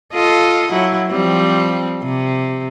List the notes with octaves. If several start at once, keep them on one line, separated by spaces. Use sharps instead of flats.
F4 A4 D#5
F#3 E4
F3 G3 C4
C3